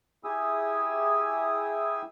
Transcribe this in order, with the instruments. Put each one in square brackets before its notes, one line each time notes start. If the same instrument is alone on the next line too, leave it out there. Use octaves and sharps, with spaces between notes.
[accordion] E4 G4 G#4 G#5 D#6 E6